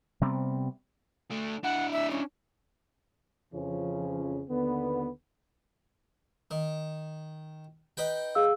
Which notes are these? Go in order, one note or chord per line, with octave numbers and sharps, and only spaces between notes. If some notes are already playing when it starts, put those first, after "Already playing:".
C3 G3 B3 C4
A3 D4
D4 E4 F#5
E5
C#4
F2 C#3 E3 F3 C#4
D#2 D3 B3
D#3
D#4 B4 G5
G#4 F5 E6